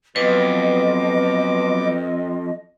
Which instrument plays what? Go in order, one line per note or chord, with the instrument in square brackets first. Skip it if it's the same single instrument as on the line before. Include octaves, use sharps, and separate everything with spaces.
[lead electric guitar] F2 [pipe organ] F#3 B3 D6 [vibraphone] B4 [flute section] D#5